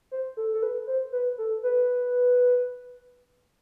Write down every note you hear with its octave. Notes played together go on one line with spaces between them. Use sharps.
C5
A4
A4
B4
C5
B4
A4
B4